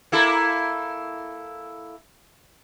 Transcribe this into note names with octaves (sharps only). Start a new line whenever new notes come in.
A#3 E4 A4